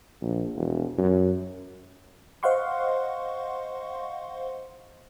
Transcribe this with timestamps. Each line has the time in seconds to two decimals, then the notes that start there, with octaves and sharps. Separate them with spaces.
0.22 A#1
0.55 E1
0.98 F#2
2.43 C5 D#5 F5 F#5 C6 C#6